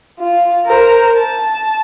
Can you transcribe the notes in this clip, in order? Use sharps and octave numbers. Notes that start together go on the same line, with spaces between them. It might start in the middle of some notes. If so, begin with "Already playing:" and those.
F4
A#4 C5
A5